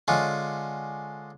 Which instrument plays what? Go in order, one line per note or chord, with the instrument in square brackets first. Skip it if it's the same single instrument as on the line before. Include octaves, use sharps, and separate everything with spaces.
[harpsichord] D3 G#3 C#4 F4